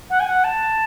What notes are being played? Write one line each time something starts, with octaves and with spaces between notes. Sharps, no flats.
F#5
G#5
F#5
A5